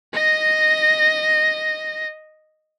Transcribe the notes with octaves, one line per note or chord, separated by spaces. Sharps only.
D#5 A#6